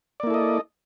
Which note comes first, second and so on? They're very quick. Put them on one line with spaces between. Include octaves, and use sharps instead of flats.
D5 A#3 E4 A4 D#5